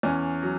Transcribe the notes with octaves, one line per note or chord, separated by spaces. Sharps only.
E2 C#4
F#3